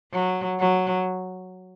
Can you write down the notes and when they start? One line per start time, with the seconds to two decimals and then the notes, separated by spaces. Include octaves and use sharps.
0.12 F#3
0.59 F#3